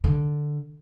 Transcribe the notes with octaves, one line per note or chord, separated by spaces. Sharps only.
D3